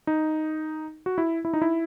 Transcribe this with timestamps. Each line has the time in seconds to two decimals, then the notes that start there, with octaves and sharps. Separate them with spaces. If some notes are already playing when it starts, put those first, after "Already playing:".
0.07 D#4
1.06 F#4
1.18 E4
1.45 E4
1.54 D#4
1.62 E4